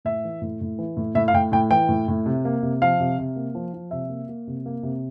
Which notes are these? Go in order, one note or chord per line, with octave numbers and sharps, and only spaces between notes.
A2 E5
E3
A2
A2
E3
A2
A2 E5
F5
A2 G5
A2 G5
E3 G5
A2
A2
C3
A#3
C3
F3 F5
C3
C3
A#3
F3
F3
C3 E5
A#3
A#3
C3
A#3
C3